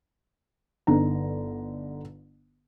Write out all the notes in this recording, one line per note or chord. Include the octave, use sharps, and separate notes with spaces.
G1 D3 D#4 A#5